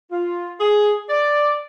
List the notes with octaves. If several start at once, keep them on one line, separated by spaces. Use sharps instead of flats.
F4
G#4
D5